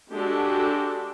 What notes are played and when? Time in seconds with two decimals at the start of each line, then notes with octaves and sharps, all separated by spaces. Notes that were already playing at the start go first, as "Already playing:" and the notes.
0.13 G#3 D4 F#4 G4 A4